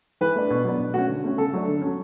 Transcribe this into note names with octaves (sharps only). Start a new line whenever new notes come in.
E3 B4
A3 D4
B2
F#3 B3 D4
B2
A3 C#4 F#4
D3
A3 C#4
C#3 A4
F#3 A3 D4
D3
F#3 C#4